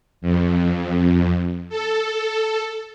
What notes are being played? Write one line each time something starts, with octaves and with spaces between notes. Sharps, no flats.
F2
A4